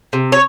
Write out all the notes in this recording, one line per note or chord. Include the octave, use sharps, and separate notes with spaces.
C3
C#5